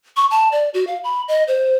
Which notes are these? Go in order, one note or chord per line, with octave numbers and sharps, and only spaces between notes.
C#6
A5
D5
F#4
F5
B5
D#5
C5